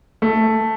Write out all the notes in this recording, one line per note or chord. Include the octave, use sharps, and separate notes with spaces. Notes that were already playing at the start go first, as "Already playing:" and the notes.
A3